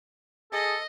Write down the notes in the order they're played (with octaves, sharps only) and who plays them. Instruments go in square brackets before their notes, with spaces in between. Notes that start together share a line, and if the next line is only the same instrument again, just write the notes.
[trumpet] G#4 [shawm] A4 [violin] D#5